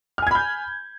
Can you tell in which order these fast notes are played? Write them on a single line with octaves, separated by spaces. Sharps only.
F6 G#5 G#6 B5 G6